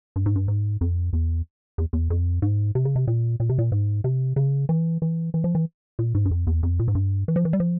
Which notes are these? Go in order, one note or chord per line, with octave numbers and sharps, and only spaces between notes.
G2
G#2
G2
G#2
F2
E2
E2
E2
F2
G#2
C3
C#3
C3
A#2
A#2
C3
A#2
G#2
C3
C#3
E3
E3
E3
F3
E3
A#2
G#2
G2
F2
E2
F2
A#2
G#2
G2
E3
F3
E3
G3
F3